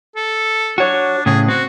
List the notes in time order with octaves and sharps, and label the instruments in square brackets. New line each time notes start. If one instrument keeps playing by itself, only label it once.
[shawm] A4
[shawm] D4 [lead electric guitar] F#4 C#5
[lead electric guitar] A2 C#3 [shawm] G#4
[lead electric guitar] C4 [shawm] F#4